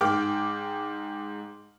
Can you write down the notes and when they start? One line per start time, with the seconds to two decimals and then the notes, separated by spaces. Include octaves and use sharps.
0.01 G#2 G5 D6 F6